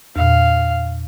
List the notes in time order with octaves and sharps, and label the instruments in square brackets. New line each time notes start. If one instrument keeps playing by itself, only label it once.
[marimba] E2 A#2 [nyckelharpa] F5